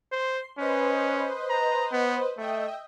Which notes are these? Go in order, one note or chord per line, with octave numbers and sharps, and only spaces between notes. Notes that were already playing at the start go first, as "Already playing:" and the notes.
C5 C6
C#4 B4 C5 D#5
A#5
B3
A3 D#5 E5 G5